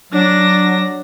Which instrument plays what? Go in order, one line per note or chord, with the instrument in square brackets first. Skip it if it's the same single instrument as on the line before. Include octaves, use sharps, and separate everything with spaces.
[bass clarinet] F#3 [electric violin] D4 A#6